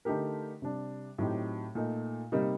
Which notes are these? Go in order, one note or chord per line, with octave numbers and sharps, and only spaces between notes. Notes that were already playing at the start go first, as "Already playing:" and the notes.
D3 A3 D#4 G4 A#4
C3 G3 D4
A2 F#3 C4 D#4 G4
A#2 A3 D#4
C3 G3 A#3 D#4